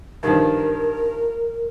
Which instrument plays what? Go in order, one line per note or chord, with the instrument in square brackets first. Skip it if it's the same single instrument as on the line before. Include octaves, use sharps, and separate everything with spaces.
[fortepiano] G2 D#3 F3 [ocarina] A#4